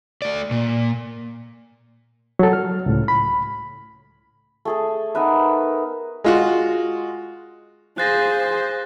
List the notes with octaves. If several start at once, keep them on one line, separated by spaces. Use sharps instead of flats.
A3 D5
A#2
F#3 A4
F6
C#2 A2
B5
A3 G#4 A4
B3 D#4 A#4 B4 E5 G#5
G#3 F4 F#4
G#4 C5 F5 F#6 A6 A#6